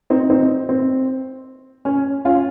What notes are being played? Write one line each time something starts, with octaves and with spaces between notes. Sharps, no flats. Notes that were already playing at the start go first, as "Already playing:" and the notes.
C4 D#4
C4 D#4
C4
C#4
C#4 F4